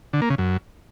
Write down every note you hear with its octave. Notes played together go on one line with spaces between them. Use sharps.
D3
A#3
C#3
F#2